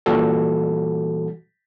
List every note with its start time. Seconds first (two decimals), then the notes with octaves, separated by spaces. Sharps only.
0.06 A#2 E3 G3 F#4 A4